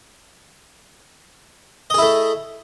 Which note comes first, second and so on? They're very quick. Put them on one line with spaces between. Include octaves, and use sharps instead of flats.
D#5 G#4 E4 A3